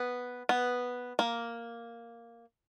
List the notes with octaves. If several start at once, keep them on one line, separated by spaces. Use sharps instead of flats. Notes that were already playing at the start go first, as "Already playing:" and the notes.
Already playing: B3
B3
A#3